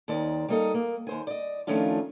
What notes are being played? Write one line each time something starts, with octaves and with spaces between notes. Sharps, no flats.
D#2 D#3 C5 D5
G3 A#3 D#4 G#4 A4 D#5
A#3
D#2 C5 G#5
D5 D#5
D#3 F3 A3 C#4 D4 F4